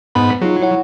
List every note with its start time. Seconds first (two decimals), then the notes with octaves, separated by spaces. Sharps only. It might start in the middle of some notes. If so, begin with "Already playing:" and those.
0.15 G#2 B3 B5
0.41 F#3 D#4 F4 G#4
0.62 E4 C#5 F#5